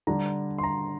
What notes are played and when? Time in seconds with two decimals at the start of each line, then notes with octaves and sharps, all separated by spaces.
0.07 D3 G3 D4 A#5
0.58 C6
0.63 A#5